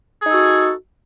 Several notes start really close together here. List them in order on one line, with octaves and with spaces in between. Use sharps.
G#4 D#4 A4 F#4